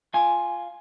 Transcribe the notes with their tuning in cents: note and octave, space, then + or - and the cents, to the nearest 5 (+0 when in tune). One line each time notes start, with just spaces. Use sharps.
F4 +0 G#5 +5